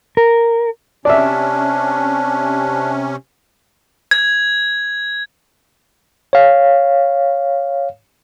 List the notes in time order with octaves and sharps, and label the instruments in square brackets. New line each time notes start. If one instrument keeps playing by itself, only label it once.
[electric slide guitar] A#4
[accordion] C3 C#4 [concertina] D4 [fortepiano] D5 E5
[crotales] G#6
[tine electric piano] C#5 F5